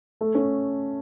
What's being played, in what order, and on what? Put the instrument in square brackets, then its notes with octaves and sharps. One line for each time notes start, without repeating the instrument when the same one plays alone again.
[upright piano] A3
C#4